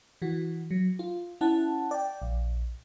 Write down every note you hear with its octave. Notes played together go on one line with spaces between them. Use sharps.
E3 F#4
F#3
F4
C#4 E4 F#5 A5
D5 G5
A#1